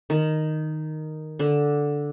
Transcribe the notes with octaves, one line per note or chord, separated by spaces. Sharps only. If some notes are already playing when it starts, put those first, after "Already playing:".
D#3
D3